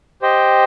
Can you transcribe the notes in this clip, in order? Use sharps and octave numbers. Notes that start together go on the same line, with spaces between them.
G4 C5 D#5 G5